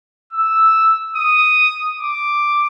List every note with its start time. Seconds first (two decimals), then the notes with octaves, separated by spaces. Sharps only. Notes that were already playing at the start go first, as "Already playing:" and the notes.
0.33 E6
1.16 D#6
2.00 D6